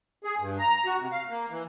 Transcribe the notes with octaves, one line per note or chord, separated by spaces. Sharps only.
G#4
G2
A#5
F#4
C3
F5
A#3
E3